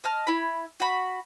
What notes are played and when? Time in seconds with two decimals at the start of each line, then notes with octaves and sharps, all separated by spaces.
0.04 D#5 A5 F6
0.27 E4 B5
0.80 F#4 B5